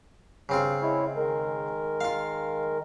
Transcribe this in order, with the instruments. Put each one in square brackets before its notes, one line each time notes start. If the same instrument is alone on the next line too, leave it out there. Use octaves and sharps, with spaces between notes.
[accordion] G2 [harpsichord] C#3 C4 F4
[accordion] G#3 E4 C#5
D#3 G#3 A#4
[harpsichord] F4 F5